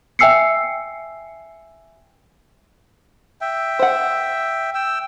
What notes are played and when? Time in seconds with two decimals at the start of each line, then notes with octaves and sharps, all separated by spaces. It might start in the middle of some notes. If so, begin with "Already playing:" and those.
0.19 E5 G5 G#5 E6 C7 C#7
3.41 E5 G5
3.79 C5 F#5
4.75 G5 E6